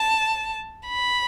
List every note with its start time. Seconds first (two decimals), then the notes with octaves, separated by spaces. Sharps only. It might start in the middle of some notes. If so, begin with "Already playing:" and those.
Already playing: A5
0.88 B5